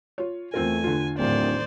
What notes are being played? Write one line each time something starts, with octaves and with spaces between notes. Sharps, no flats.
F4 C#5
E2 A3 C4 F4 A#4 G#5
D3 F4
D1 A2 D#3 A3 C5 D5